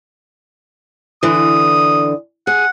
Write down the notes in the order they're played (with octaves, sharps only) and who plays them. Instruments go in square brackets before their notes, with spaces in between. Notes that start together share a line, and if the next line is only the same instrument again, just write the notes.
[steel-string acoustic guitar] D3 E3 [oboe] D#6
[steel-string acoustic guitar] G#4 [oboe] F#5